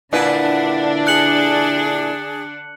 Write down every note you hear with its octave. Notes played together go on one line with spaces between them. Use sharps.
A#2 D3 D4 E4 B4 F#5
G#4 F#6 C#7 F#7